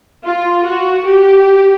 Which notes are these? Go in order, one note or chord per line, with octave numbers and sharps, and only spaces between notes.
F4
F#4
G4